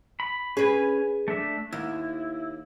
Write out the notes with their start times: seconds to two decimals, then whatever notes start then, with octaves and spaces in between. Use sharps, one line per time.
0.20 B5
0.57 C#4 G#4 B4 G#5
1.28 A3 D4 E5
1.73 D#2 E4